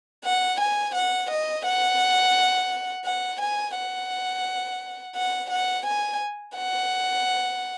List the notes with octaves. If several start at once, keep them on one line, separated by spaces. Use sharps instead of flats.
F#5
G#5
F#5
D#5
F#5
F#5
G#5
F#5
F#5
F#5
G#5
F#5